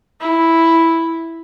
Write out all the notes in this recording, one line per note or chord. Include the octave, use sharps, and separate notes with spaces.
E4